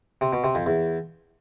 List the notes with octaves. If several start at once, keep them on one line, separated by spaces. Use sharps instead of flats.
C3
B2
C3
F2
E2